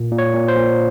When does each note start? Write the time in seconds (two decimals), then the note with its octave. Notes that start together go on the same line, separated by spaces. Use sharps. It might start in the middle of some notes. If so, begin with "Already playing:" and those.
Already playing: A#2
0.11 A#2
0.18 C#5
0.33 A#2
0.48 C5
0.56 A#2